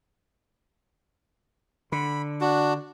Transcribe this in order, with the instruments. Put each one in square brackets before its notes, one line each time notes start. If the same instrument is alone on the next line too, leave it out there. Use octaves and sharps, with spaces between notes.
[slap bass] D3 [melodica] B5
[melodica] D4 F#4